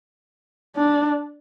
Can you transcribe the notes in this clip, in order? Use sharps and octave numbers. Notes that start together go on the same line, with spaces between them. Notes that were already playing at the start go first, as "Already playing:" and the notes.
D4